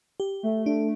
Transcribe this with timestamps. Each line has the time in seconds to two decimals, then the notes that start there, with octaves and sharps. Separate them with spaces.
0.20 G4
0.43 A3
0.66 A3 D4